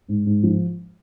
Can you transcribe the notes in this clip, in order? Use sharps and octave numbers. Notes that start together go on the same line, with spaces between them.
G#2
G#2
F3